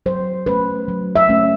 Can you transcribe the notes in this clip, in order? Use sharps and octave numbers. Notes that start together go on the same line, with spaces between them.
F#3 C5
A3 C#4 B4
F#3
E5
A3 C#4